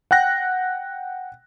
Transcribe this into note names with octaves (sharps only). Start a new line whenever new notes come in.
F#5 G5 F#6 A#6